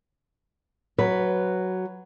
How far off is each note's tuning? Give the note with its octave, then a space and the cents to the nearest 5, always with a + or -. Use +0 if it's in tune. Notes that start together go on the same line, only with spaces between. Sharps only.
F#3 +5 B4 +0